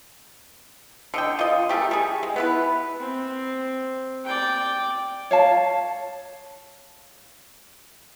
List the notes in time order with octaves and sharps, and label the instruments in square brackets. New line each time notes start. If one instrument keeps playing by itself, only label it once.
[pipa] D3 D#5 G5
F4 D#5
A3 G4 G#4 A#4
G3 G#4
G#3
B3 E4 B4
[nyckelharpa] C4
D5 G5
[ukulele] C#5 F5 A5